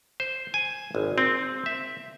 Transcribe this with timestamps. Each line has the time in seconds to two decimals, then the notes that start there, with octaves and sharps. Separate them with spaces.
0.20 C5
0.54 G#5
0.95 G#1
1.18 C4
1.66 E5